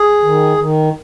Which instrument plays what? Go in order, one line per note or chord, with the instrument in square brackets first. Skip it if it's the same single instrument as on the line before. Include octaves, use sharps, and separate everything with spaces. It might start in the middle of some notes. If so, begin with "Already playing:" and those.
Already playing: [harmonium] G#4
D#3
D#3